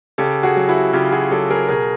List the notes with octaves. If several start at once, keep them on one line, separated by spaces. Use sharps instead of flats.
C#3 G4 A4
F#4 G#4
F#3
E4 F#4
C#3 F4 G4
F#4 G#4
F#3 G4 A4
G#4 A#4
B2 G#4 A#4